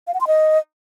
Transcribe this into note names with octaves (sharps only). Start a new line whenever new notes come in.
F5
F#5
C6
D#5